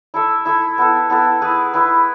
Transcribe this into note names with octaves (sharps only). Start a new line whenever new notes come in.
E4 A4 E5
E4 A4 E5
B3 E4 A4
B3 E4 A4
E4 G#4 B4
E4 G#4 B4